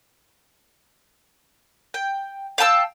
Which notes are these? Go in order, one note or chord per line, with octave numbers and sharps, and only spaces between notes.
G5
F5 G5 A5 E6